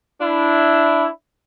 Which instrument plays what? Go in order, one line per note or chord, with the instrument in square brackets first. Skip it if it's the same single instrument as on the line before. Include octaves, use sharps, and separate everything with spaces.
[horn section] D4 E4